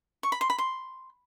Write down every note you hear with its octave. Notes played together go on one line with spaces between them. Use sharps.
C#6
B5
C6
B5
C6